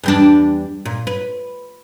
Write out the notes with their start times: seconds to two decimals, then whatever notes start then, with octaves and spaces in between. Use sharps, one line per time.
0.03 E2 G3 D4
0.85 A#2
1.07 B4